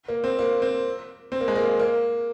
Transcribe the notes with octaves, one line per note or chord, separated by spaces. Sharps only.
A#3
C4
A#3
C4
C4
A#3
G#3
A#3
A#3